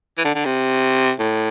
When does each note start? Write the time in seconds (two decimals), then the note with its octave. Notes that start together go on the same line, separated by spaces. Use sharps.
0.18 E3
0.25 D3
0.35 D3
0.45 C3
1.19 A2